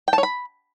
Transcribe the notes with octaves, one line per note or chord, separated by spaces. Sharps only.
G5
A5
C#5
B5